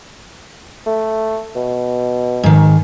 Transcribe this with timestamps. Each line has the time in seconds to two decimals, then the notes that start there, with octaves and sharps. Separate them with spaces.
0.86 A3
1.56 B2
2.43 G#2 D#3